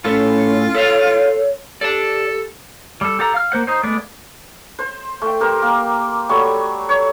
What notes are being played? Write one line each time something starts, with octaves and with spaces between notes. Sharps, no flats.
A2 C#4 F4 A4
A4 C#5 E5 F5
G4 A4 D5 A5
G3 A4
G4 A4 F#5 A#5
F5 F6
A#3 C5 F#5
D#4 C5
G#3 A3 B3 D5
C5
A3 G5
G4 A#4 C5
A#3
F#3 G3 A3 C#6
C#5